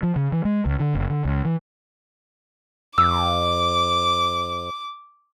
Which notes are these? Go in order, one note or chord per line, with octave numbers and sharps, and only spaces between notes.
F3
C#3
E3
G#3
C#2
D3
F#1
D3
C#2
E3
F2 D6 E6